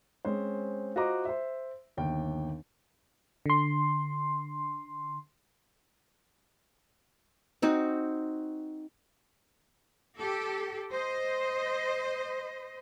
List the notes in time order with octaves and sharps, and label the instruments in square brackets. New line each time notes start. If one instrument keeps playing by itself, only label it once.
[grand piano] G#3 C4 C#4 C5
F4 F#4 C5 D#5 A#5 D6
C5 E5
G1 D#2 G5
[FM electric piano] D3 C6
[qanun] C4 D#4 F#4
[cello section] G4 A4
C5 D#5